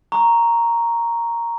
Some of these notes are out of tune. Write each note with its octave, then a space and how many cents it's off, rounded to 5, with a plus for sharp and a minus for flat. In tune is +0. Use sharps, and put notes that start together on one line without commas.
A#5 +0 C#6 +0